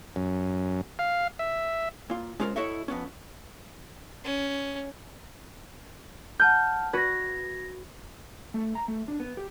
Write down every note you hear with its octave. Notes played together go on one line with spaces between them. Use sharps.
F#2
F5
E5
A#2 F4
G#3 C#4 F4 G#4 A#4 C5
E4 F#4 A4 C#5 D#5 E5
F2 B3 C#4
C#4
F#5 A5 F6 G6
F#4 B4 G#6 A#6
A3
A#5
A3
D4
B3
G4